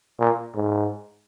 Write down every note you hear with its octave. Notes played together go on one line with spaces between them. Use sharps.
A#2
G#2